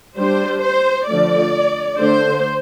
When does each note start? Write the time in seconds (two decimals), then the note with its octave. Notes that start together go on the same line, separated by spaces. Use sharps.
0.17 G3 D4 C5
0.62 C5
1.08 D3 F3 A3 D5
1.97 D3 A3 D4 C5